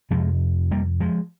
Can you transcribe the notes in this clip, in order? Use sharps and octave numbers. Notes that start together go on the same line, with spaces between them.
F2 C3 F3 G#3
G3 A#3
F3 G#3